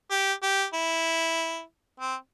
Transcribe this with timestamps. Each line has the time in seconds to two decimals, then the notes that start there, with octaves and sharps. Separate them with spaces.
0.11 G4
0.43 G4
0.74 E4
2.00 C4